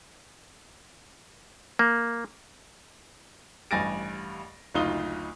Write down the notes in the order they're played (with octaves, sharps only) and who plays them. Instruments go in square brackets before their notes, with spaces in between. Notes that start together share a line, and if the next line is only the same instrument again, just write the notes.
[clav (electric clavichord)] A#3
[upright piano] A1 G2 G#5 A6 A#6 D7
F#1 D2 D#4 F4 D#6 G7